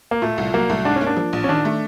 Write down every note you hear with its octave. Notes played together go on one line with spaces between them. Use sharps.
A#3
A#2 A3
C2
F#3 A#3
C2 A3
G#2 D4
C#4
A#3
D4
F3
A#1
C#4
D#3 D4
A3